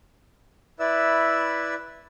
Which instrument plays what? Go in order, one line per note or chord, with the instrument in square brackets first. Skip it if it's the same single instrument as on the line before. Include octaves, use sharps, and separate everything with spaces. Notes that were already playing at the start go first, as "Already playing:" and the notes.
[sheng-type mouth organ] E4 B4 D5 E5 E6